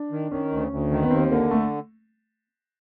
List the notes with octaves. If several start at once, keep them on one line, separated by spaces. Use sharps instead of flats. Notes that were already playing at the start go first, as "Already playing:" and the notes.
Already playing: D4
D#3
D#3 C#4
D2
D2
D#3
B3
D#2 C4
D3 A#3
A3